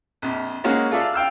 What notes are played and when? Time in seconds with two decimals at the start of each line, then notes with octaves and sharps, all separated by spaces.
0.22 A#1 F2
0.64 G#3 A#3 C#4 F#4 G#4
0.91 F4 G#4 A4 D5 E5 F5
1.14 F5 G5 E6 F6